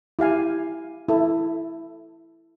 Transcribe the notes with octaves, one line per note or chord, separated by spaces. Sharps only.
E4 G4 F5 G#5
E4 A4